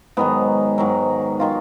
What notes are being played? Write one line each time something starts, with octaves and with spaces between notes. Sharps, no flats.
G#2 D#3 F#3 B3
G#2 D#3 F#3
D#3 F#3 F4